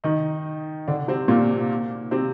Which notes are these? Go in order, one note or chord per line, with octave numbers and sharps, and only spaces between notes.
D#3 D#4
D3 D4
C3 C4
A#2 A#3
C3 C4